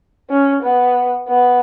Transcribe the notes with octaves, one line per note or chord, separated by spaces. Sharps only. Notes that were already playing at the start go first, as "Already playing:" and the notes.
C#4
B3
B3